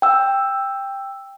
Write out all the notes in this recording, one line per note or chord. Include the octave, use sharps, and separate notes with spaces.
G5 E6